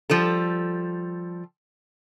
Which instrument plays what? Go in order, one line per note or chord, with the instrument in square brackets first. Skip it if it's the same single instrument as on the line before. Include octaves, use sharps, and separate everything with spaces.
[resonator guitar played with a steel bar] F3 G3 A4